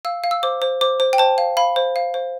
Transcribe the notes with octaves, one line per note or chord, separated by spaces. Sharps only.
F5 E6
F5
E6
C5 D6
C5
C5 D6
C5
G5
C5 A5
F5
F5 B5
C5
F5
C5